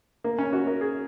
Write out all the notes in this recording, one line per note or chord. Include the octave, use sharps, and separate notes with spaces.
A#3
C#4
F#4
A#4
G#4